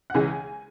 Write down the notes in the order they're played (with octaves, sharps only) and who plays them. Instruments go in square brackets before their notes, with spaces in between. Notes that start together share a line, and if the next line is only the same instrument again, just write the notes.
[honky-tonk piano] F#5
C#2 C#3 E3 G#3 G#5